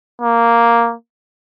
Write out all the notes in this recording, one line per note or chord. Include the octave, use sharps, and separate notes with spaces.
A#3